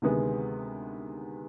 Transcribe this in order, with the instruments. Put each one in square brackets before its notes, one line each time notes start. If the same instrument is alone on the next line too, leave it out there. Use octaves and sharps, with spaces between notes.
[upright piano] D2 C3 D#3 G#3 B3